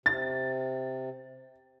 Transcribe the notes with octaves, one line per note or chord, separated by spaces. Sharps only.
C3 A6